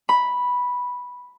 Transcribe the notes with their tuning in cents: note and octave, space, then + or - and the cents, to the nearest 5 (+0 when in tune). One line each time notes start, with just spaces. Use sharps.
B5 -5